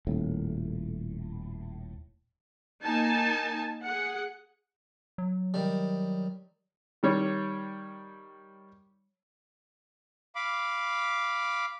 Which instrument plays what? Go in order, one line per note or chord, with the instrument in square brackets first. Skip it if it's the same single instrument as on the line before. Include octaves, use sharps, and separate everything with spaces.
[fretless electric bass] D#1 A2
[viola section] A#3 D#4 G#5 A5
G#4 F#5
[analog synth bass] F#3
[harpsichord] D#3 G3
[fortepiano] D#3 G3 C#5
[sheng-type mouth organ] F5 B5 D6